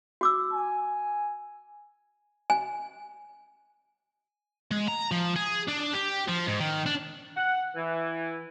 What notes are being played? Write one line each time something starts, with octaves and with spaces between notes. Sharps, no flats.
F#4 D6 E6
G#5
G#5
G#3
A#5
F3
G#4
D4
G4
F3
G#2
D#3
D4
F#5
E3